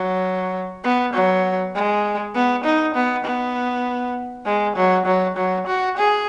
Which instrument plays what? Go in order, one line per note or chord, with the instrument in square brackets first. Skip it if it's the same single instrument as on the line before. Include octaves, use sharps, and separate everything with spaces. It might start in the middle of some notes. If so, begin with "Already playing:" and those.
Already playing: [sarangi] F#3
B3
F#3
G#3
B3
D#4
B3
B3
G#3
F#3
F#3
F#3
F#4
G#4